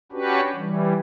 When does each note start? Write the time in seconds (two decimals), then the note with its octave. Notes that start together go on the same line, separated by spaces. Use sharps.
0.12 C#4 D4 F#4 G4 B4
0.56 E3 G3